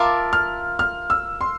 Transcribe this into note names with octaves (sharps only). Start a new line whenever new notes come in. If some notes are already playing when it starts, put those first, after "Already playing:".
Already playing: F4 A#4 E5 A5 D6
F6
F6
E6
C6